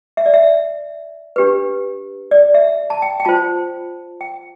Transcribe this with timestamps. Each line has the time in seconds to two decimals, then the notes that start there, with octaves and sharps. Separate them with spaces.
0.17 E5
0.26 D5
0.34 E5
1.36 D4 G4 B4
2.31 D5
2.54 E5
2.90 A5
3.02 G5
3.20 G5
3.25 F4 C5 A5
4.21 G5